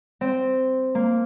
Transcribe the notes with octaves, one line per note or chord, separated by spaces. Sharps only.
C4
A#3